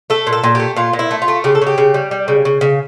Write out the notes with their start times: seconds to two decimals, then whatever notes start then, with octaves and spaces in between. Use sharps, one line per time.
0.10 A3 A4
0.27 A#2
0.33 A4
0.44 A#2
0.55 A3 G4
0.76 A#2 F4
0.93 A#2
0.99 E4
1.11 A3
1.22 F4
1.28 A3
1.44 C#3 G4
1.55 A4
1.62 C#3 G4
1.78 C#3
1.94 G3
2.11 G3
2.28 C#3
2.45 C#3
2.61 C#3